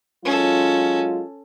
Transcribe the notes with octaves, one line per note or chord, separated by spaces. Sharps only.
F#3 G#3 C#4 F4 A4